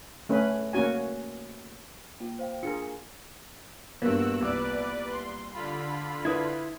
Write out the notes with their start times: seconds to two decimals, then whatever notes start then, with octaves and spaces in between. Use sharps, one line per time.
0.29 A3 C#4 B4
0.73 A#3 C#4 F#4 G#5
2.20 A#3 F4
2.39 C5 F5 G5
2.63 D4 F4 G#4 A#4 C#7
2.83 G#5
4.02 G2 A#2 A#3 B3 F#4 E6 F#6
4.41 C2 B4 D5 D6 E6 F#6
5.10 C6
5.53 D3 F4 B5
6.25 E4 B4 D#6 G#6